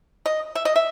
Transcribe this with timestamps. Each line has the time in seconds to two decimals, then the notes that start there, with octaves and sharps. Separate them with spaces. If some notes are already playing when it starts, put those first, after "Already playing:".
0.26 D#5
0.55 E5
0.65 D#5
0.76 E5